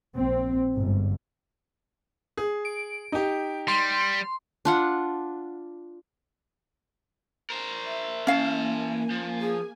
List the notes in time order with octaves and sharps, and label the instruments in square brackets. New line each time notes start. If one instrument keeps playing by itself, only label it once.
[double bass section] A#1 C4
G1 G#2
[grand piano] G#4
[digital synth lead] D7
[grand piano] D#4 G4
[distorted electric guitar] G3 [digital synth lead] C6
[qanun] D4 F4 F#5
[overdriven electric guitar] A#4 C5
[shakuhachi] E5
[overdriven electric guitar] E3 A5 [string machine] A#3 G#5 [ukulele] C#4 F5
[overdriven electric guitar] F3
[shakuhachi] G#4